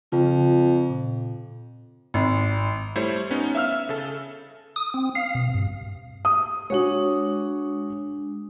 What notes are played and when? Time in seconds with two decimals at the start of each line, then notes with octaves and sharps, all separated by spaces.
0.12 F2 C#3 F4
0.90 A#2
2.14 G#1
2.96 G3 A3 E4 C5 C#5
3.31 B3 C#4 D#4
3.55 E5 F5 E6 F6
3.72 E5
3.89 C#3 A4
4.76 D#6
4.94 C4
5.15 F5
5.35 B2
5.54 G2
6.25 D#6
6.70 G#3 D4 F#4 C#5